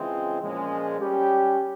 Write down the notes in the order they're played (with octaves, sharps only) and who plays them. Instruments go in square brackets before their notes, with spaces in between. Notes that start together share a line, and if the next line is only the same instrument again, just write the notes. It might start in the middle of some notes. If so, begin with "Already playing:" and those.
Already playing: [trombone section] C#3 E3 G#3 C4 F4
A#2 F3 G#3 C#4
G3 C#4 G4